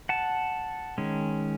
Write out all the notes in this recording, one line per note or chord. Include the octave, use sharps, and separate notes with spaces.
F#5 A5
D#3 G#3 C#4